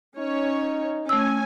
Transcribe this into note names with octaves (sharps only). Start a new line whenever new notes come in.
C#4 D#4 C#5
A3 C#4 G#5 E6